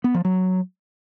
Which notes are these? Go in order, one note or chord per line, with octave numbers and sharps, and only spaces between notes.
B3
F3
F#3